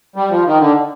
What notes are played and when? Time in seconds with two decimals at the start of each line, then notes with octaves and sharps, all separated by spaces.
0.16 G3
0.30 F3
0.45 D#3
0.59 D3